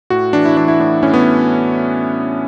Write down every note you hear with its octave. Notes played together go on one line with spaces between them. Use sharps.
A2 F#4
E3 D4
E4
E3 D4
E4
A2 D4
A2 C#4
B3